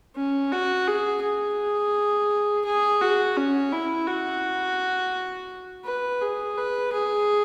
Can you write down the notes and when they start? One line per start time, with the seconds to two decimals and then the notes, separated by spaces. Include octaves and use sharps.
0.16 C#4
0.52 F#4
0.88 G#4
1.22 G#4
2.65 G#4
3.01 F#4
3.37 C#4
3.72 E4
4.07 F#4
5.85 B4
6.21 G#4
6.57 B4
6.92 G#4